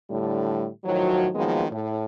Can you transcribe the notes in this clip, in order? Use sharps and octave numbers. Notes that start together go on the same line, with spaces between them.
A2 D3 G3
A2 D#3 F3 F#3
D#3 F3 F#3 G#3 A#3 B3
A2